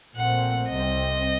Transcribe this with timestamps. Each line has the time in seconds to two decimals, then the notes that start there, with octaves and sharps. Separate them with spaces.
0.17 A#1 A#2 A3 C4 F#5
0.69 C2 C3 G3 C4 D#5